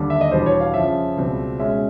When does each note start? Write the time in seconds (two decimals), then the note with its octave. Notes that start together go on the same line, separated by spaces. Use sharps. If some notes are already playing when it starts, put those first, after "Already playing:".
Already playing: D#2 D3 G3
0.10 E5
0.21 D#5
0.32 E2 B2 G3 B3 D4 C5
0.46 C#5
0.60 F5
0.74 F2 C#3 F3 E5
1.17 C#2 B2 G3 C4
1.60 B2 G#3 C#4 E5